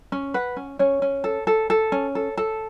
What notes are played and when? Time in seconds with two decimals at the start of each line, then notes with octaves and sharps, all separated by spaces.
0.12 C#4
0.34 B4 F#5
0.57 C#4
0.79 C#4 C#5
1.02 C#4
1.24 A4
1.47 A4
1.70 A4
1.92 C#4
2.15 A4
2.37 A4